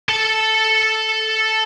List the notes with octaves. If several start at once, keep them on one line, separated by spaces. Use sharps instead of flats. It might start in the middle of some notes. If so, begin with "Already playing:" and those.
A4 A5